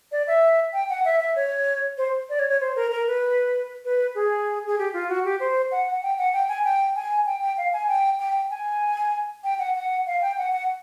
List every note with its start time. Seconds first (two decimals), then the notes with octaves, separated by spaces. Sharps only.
0.12 D5
0.27 E5
0.73 G5
0.89 F#5
1.05 E5
1.20 E5
1.36 C#5
1.98 C5
2.29 D5
2.39 C#5
2.50 C#5
2.61 C5
2.76 A#4
2.91 A#4
3.07 B4
3.85 B4
4.15 G#4
4.67 G#4
4.78 G4
4.93 F4
5.09 F#4
5.25 G4
5.40 C5
5.71 F#5
5.86 F#5
6.02 G5
6.18 F#5
6.33 G5
6.48 G#5
6.64 G5
6.96 G#5
7.26 G5
7.42 G5
7.57 F5
7.73 G#5
7.88 G5
8.19 G5
8.51 G#5
9.44 G5
9.59 F#5
9.75 F#5
10.07 F5
10.21 G5
10.38 F#5
10.52 F#5